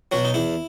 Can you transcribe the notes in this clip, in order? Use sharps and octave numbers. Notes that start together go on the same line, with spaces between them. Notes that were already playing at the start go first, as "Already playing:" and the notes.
B2 F#3 F#4
D#4
E2 E4